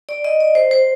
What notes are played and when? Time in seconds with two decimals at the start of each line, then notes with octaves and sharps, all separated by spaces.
0.09 D5
0.24 D#5
0.40 D5
0.55 C5
0.71 C5